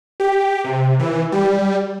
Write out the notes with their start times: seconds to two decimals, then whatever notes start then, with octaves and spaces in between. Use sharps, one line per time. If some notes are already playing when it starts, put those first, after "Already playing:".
0.20 G4
0.64 C3
0.99 E3
1.32 G3